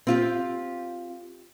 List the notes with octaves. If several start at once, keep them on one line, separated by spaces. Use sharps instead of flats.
C4 F4 G4